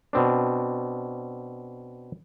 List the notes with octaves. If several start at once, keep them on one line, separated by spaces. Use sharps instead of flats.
B2 C4 D4